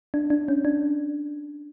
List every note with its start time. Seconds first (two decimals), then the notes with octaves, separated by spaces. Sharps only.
0.14 D4
0.30 D4
0.48 C#4
0.65 D4